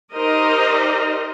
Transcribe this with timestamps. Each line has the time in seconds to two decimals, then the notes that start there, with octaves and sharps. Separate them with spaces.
0.15 D#4 G4 A#4 C5 D#5